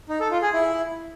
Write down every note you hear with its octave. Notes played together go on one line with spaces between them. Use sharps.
D#4
A4
F4
G#4
E4